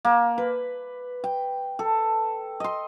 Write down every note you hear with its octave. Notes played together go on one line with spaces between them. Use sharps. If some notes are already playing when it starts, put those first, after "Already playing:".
A#3
B4
G5
A4
D#5 C6